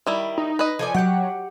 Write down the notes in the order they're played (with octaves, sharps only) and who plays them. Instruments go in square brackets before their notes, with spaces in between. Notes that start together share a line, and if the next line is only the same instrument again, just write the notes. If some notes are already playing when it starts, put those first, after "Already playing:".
[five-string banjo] D#3 G3 E4
[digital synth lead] D#4
[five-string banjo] B4 D#5
[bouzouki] F3 A4 D5 [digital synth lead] G#5
[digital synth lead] F#3 [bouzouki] G4 F#5